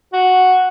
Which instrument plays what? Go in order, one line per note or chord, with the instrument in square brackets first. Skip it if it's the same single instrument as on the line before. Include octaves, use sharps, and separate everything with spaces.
[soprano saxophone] F#4